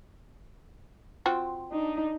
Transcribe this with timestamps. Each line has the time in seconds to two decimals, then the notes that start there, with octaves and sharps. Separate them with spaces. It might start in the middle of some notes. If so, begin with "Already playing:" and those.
1.26 C4 F4 F#4
1.71 D4 D#4